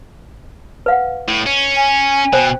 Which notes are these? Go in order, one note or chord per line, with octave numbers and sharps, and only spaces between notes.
B4 F5 F#5
A2
C#4
G#5
B2 C5 G5